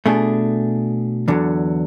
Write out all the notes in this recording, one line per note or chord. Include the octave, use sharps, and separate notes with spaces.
B2 A3 D4 G#4
E2 D3 F#3